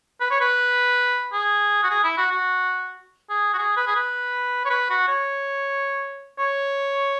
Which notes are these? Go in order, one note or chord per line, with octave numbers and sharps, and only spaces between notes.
B4
C#5
B4
G#4
F#4
G#4
E4
F#4
F#4
G#4
F#4
G#4
B4
G#4
B4
C#5
B4
F#4
C#5
C#5